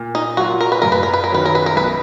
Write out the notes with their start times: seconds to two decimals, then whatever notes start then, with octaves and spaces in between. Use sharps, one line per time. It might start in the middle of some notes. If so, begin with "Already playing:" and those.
Already playing: A#2
0.15 D#4
0.37 F#3 A#3 F4 F#4
0.61 A#4
0.72 B4
0.82 F#2 A#4
0.92 B4
1.03 A#4
1.13 B4
1.24 A#4
1.30 D#3 F#3 C#4 B4
1.45 A#4
1.55 B4
1.66 A#4
1.76 B1 B4